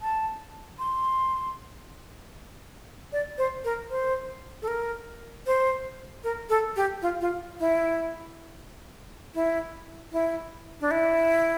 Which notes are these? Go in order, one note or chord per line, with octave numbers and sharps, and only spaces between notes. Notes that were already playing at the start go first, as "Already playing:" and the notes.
A5
C6
D5
C5
A#4
C5
A4
A#4
C5
A#4
A4
G4
F4
F4
E4
E4
E4
D4
E4